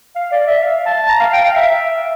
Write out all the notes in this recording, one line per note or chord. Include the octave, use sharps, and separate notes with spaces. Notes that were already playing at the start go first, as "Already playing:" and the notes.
F5
D5
E5
F5
A5
A#5
F5
G5
F5
E5